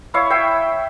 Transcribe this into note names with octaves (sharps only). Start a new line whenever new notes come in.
E4 C#5 F5
E5 G5